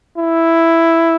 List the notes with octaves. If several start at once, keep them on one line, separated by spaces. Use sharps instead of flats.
E4